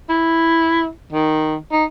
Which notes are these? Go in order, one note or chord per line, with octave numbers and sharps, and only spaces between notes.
E4
D#3
D#4